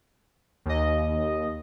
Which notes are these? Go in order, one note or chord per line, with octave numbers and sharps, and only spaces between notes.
D#2 D#5